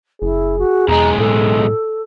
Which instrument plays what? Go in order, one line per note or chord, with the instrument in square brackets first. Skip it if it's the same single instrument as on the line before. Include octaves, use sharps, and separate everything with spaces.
[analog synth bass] F#1 [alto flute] E4 [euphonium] G#4
[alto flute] F#4
[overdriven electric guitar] B1 G#3 [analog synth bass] E2 [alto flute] A#5
[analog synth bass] A2 [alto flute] A4